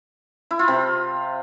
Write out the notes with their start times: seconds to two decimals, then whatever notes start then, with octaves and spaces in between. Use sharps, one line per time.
0.51 E4
0.59 F4
0.68 C3